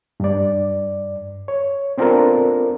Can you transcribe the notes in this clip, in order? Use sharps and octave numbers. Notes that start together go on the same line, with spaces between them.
G2 D5
C#5
B3 C4 D4 F4 A4 A#4